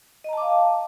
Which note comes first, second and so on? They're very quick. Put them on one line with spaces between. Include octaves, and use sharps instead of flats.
D#5 A#5 A5 D6 F5